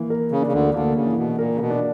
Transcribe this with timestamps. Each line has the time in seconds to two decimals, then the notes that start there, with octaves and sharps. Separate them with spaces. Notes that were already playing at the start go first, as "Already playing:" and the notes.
Already playing: E3 A#3
0.10 A#4
0.32 C#3
0.42 C#3 D4
0.52 D2 D3
0.74 D2 D3 A#3
0.96 C#3
1.06 E3
1.17 B2
1.38 A#2 A#4
1.55 C#3
1.60 B2
1.70 D4